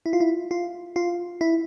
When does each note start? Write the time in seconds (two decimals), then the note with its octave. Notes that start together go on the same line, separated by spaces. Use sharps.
0.06 E4
0.13 F4
0.20 E4
0.51 F4
0.96 F4
1.41 E4